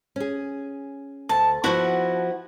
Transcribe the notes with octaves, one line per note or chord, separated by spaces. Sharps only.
C#4 G#4
D2 A5
F3 B3 E4 F#4 F#5